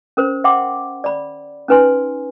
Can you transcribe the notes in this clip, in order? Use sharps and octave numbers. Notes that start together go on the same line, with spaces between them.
C#4 A#4 C5
E5 F#5 G5 C6 D6
D5 B5
C#4 D#4 B4 G#5 C6